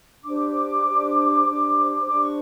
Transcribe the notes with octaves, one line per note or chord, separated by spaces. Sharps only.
D4 G4 C5 D6
D4 G4 C5
D4 G4 C5
D4 G4 C5 D6
C#6